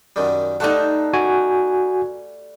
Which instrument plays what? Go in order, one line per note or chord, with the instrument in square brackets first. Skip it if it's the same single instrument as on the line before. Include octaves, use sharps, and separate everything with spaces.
[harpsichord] F#2 D#3 G3
[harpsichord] G3 A3 F#5 [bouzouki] D#4 F5 A5
[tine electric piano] F#4 G#5